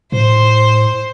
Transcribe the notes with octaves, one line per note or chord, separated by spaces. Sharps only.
A2 C5